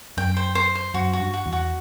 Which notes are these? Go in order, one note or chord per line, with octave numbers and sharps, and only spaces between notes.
F#2 G5
C5
C5
C5
F#2 F#4
F#4
G2
F#4
E2
F#4